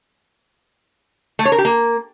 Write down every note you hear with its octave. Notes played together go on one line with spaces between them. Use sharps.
A3
C#5
A#4
G4
A#3